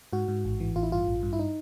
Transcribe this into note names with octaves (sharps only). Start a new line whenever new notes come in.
G#2 F#4
G#2
A1
E3
A1 F4
E4
G2 F4
A1
G2
E4
D#4